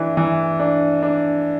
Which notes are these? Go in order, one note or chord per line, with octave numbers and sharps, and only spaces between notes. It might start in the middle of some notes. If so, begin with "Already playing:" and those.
Already playing: E3 D4
E3
D4
D4